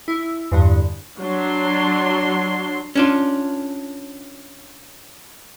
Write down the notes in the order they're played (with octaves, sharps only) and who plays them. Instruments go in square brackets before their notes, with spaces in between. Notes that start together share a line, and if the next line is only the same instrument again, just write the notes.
[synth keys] E4
E2 G2 D3
[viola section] F#3 D4 C6
[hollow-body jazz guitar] C#4 D4 F4